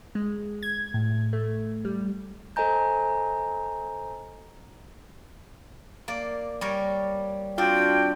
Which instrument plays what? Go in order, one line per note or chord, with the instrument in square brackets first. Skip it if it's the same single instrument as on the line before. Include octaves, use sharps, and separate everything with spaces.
[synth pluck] G#3
G#6
A2
A3
G3
[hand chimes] A4 C5 D#5 G#5 A#5 G6
[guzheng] A#3 D5
G3 A#4 C#5
[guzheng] C4 D4 [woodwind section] F4 F#4 G5